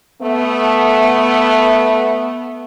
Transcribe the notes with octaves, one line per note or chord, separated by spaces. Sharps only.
A3 B3